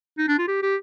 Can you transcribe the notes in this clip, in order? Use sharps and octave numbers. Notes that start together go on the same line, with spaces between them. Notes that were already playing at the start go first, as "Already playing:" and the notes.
D#4
D4
F4
G4
G4